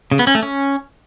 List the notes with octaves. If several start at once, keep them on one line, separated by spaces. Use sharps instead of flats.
C#3
B3
C#4
A3
C#4